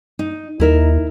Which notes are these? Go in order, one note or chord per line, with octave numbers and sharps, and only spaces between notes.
D#4
D#2 D#4 E4 A#4 E5